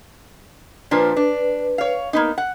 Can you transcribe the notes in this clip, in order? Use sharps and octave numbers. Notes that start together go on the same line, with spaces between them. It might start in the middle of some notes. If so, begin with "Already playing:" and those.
A#2 F3 D4 B4
D4
C#5 F5
A#3 B3 D#4
F#5